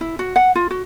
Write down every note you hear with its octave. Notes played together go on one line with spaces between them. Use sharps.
E4
F#4
F#5
F4
F#4